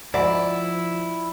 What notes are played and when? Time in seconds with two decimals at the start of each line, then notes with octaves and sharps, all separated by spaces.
0.14 D2 G#2 F3 E4 D5